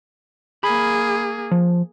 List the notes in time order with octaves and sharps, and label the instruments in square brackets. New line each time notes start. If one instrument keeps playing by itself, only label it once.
[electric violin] A#3 G#4 [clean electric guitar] B5
[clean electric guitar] F3